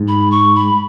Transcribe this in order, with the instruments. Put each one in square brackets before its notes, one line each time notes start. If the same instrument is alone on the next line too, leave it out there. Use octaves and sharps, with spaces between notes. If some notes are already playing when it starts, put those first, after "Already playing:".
Already playing: [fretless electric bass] G#2
[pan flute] B5
C#6
B5